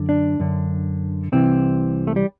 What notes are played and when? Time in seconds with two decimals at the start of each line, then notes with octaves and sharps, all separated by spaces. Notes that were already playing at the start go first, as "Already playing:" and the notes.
Already playing: F#2 D3
0.09 D4
0.39 F#2 D3
1.32 C2 C3 E3 C4
2.07 A3
2.16 G3